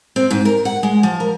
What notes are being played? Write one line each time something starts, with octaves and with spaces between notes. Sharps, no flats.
C4
G#2
A#4
F#5
G#3
F3
A#4